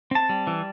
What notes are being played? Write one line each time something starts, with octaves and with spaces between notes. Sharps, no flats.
C4 A5
G3
E3